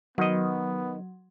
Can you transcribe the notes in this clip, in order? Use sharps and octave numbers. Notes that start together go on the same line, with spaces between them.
D#3 F#3 B3 D#5